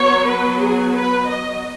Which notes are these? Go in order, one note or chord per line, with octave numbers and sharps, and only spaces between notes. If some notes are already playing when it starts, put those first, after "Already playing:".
Already playing: F#3 B3 C#5
B4
G#4
B4
D#5